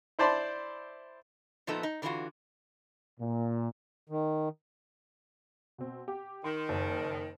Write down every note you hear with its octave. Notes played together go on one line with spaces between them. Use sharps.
E4 C5 D5 A5 B5 C6
A#2 F3 A3 B3 D#4 A4
D#4
D3 E3 C4 D#4 F4 F#4
A#2
D#3
B2 C4
G4
D#3 C6
F#1